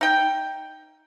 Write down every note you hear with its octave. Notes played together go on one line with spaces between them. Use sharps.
D#4 G5